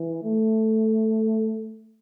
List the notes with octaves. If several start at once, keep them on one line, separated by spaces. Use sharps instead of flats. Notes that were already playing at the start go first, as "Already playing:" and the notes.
Already playing: E3
A3